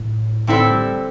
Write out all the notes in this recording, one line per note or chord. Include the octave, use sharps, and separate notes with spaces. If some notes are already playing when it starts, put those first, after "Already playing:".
Already playing: A2
A2 D3 C4 E4 A4 C5
G3